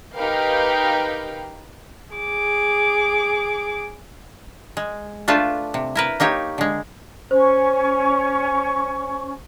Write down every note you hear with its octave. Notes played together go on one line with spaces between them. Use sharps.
D#4 G4 A#4 B4 F5 G5
G#4 D6
G#3
A3 D4 F4 A4 B4
C3
E4 A#4 B4
A#3 D#4 G4 C#5
D3 G#3
C#4 C5 C#6